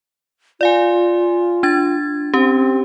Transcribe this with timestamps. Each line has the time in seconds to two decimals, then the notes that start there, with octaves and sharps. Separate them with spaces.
0.61 F4 D5 F5 G#5
1.63 D4 G#6 A6
2.34 C4 C#4 G4